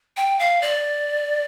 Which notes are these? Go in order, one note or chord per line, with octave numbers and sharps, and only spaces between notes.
G5
F5
D5